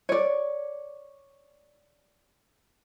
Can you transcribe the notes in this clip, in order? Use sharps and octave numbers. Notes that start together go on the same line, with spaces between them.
C#5 D5